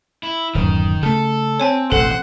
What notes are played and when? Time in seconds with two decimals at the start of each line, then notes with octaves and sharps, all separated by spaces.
0.23 E4
0.55 D1 F#2 D#3
1.03 C#3 A3 A4
1.60 C4 C#5 G#5 A5
1.92 E1 A1 A4 C5 F#5